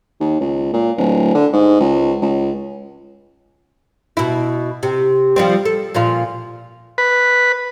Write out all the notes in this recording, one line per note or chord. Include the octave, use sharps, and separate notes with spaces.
D#2
C#2
A#2
D1
D3
G#2
C#2
C#2
B2 E4
C3
F3 G3 C4
A4
A#2 F3 F4
B4